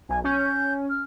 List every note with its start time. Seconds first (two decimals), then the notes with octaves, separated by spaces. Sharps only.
0.09 B1 G#5
0.24 C#4 G6
0.89 F6